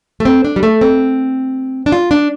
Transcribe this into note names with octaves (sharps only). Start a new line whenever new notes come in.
A3
C4
D4
G3
A3
C4
D4
F4
D4